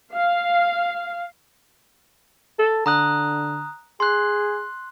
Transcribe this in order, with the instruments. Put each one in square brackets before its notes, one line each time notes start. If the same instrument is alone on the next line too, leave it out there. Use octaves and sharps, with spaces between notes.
[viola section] F5
[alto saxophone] A4
[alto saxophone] D3 [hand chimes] A#5 D#6 F#6
[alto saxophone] G#4 [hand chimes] C6 F#6